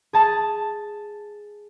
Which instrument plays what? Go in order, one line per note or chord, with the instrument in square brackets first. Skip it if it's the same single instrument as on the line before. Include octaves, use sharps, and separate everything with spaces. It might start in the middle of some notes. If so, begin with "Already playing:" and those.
[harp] G#4 A5